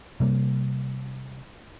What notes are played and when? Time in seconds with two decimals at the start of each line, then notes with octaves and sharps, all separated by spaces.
0.20 C3 G3 A#3